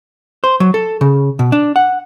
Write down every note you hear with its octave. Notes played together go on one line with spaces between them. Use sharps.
C5
F#3
A4
C#3
B2
D4
F#5